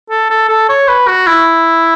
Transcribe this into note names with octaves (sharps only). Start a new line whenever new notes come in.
A4
A4
A4
C#5
B4
F#4
E4